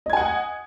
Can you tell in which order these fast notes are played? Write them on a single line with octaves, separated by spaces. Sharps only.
D#5 G#6 G#5 F#5 D#6